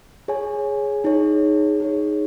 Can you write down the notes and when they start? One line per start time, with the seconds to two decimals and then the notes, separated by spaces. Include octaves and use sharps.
0.28 G#4 C#5 G#5
1.04 D#4 G#4 C#5
1.80 D#4 G#4 C#5